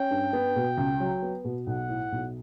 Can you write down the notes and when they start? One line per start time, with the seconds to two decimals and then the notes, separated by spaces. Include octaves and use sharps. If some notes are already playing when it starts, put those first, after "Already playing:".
Already playing: C#4 G5
0.11 G2
0.33 B3
0.56 B2
0.78 C#2
1.00 F#3
1.22 B3
1.45 B2
1.67 B1 F#5
1.89 A2
2.12 B1